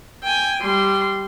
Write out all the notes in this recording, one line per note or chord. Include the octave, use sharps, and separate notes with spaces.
G5 G#5
G3 C6